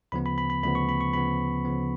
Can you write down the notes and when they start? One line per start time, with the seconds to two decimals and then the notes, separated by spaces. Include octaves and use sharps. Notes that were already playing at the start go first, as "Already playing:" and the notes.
0.12 D2 C#3 F3 B3 B5
0.26 B5
0.38 B5
0.50 B5
0.63 D2 C#3 F3 B3 B5
0.75 C#6
0.89 B5
1.01 C#6
1.13 D2 C#3 F3 B3 B5
1.65 D2 C#3 F3 B3